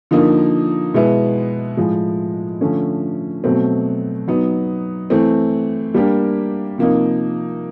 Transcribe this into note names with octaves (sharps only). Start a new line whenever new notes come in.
D3 F3 A#3 D#4
B2 G#3 B3 E4
A2 F3 G#3
D3 F3 A3 C#4
B2 F#3 A3 C4
F#3 B3 D#4
E3 A3 C4
G3 A#3 D4 G4 A#4
C3 F3 A#3 D#4